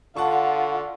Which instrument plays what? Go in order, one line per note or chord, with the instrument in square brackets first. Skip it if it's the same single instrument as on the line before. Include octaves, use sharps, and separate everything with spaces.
[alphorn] D3 [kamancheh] F4 [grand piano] F#5 A5 C#6